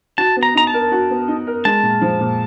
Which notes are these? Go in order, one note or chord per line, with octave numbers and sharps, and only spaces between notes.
F#4 A5
B3
A#5
D#4 A#5
A5
A#4
F#4
B3
D#4
A#4
G#3 A5
A#2
F3
A#2